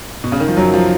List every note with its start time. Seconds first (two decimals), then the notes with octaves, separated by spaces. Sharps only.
0.24 B2
0.32 C#3
0.40 D#3
0.48 F3
0.57 F#2 F#3
0.74 F3